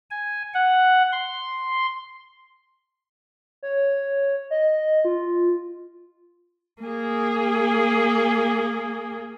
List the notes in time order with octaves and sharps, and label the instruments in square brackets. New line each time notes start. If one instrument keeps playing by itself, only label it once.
[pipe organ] G#5
F#5
C6
[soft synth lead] C#5
D#5
F4
[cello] A#3 G#4